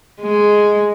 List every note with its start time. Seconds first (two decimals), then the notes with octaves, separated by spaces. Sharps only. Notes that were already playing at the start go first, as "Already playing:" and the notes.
0.22 G#3